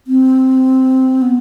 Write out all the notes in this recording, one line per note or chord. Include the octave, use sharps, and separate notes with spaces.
C4
B3